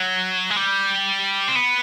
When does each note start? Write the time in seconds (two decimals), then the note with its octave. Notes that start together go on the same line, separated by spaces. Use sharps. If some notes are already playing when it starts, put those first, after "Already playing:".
Already playing: F#3
0.50 G#3
0.57 G3
1.48 C4
1.55 B3